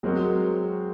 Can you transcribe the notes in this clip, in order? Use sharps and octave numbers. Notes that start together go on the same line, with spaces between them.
F#3 G#3 C4 F#4 A#4